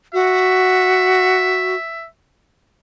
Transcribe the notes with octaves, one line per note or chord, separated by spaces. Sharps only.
F#4 E5